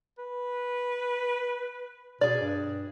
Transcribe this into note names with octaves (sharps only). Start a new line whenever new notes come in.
B4
B2 G#4 D5
G2